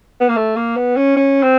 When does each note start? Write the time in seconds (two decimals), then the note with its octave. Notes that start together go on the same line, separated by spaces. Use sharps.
0.21 B3
0.29 A#3
0.36 A3
0.56 A#3
0.76 B3
0.96 C#4
1.16 C#4
1.43 C4